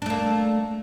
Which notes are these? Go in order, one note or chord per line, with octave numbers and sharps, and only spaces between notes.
A3 A#3 D4